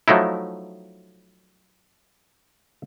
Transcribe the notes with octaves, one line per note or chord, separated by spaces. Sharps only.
F3 F#3 A3 D#4 E4